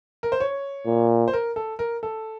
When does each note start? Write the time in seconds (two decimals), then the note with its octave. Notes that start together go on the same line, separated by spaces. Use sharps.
0.23 A#4
0.32 C5
0.40 C#5
0.86 A#2
1.28 C5
1.33 A#4
1.56 A4
1.79 A#4
2.03 A4